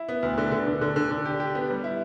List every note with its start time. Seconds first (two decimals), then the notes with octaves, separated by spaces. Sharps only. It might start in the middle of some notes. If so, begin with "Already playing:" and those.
Already playing: E4
0.09 B3
0.23 D2
0.38 D3
0.52 D3
0.67 D3
0.81 D3
0.96 D3
1.11 D3
1.25 G4
1.40 G4
1.55 B3
1.70 G3
1.84 E4